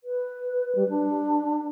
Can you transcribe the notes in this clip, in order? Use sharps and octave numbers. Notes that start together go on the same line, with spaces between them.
B4
G3
D4